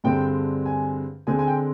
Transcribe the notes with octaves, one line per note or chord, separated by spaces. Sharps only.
G2 D3 G#3 C4 G5
G#5
D3 G#3 C4 G#5
G#5
G5